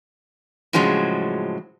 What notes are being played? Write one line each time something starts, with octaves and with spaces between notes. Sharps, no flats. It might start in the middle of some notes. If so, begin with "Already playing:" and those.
A2 C#3 F3 F#3 G#3